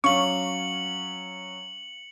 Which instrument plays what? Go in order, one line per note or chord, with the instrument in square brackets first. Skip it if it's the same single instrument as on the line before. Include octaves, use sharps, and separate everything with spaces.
[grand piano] F#3 C#4 [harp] F5 D6 D7 [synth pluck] C#6 [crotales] C#7 F#7